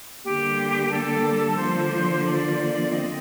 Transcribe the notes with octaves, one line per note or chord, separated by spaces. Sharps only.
D3 G3 A#3 G4
A4
D3 F3 A#3 C5
D5
C4 D#5